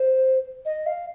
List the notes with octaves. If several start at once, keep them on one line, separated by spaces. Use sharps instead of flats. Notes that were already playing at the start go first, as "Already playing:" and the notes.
Already playing: C5
D#5
F5